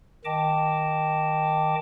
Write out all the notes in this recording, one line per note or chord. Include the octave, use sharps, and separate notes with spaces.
D#3 D#5 G5 A5 D6